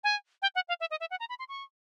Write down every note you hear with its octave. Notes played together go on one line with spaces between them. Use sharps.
G#5
G5
F#5
F5
E5
D#5
E5
F#5
A#5
B5
C6
C#6